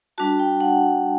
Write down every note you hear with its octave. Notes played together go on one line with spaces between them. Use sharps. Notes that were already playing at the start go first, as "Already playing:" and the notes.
G3 D4 F#4 A5
G5
F#5